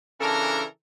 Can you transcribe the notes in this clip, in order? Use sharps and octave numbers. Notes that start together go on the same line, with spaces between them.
C#3 E3 D4 A4 A#4